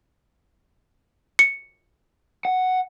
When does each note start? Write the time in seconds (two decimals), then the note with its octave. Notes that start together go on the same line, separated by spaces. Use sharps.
1.39 C#7
2.45 F#5